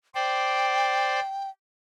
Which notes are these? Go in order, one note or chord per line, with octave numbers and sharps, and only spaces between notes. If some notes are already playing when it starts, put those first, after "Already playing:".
C5 D5 G5